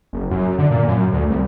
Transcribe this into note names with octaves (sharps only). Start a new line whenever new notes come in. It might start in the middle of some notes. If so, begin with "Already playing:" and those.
F#1
F#2
D3
A#2
F#2
D2
C2